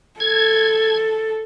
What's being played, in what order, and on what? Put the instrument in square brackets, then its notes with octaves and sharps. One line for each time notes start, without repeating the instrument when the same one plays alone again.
[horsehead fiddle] A4 [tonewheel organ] G#6